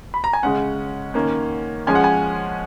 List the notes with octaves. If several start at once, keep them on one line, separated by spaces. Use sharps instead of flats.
B5
A#5
G#5
C#3 G#3 C#4 F#5
D#3 A#3 C#4
F3 G#3 C#4 G#5
F#5
G#5